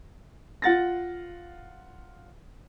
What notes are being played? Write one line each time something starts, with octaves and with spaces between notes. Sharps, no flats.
F4 F#5 A6 A#6